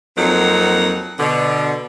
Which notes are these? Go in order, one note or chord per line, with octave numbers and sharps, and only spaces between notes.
F2 F#3 A#3 C4 D#4 F#5
B2 D3